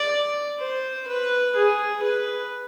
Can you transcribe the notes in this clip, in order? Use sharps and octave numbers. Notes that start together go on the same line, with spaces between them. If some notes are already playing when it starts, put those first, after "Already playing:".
Already playing: D5
C5
B4
G#4
B4